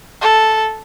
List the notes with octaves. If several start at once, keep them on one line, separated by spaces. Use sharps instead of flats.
A4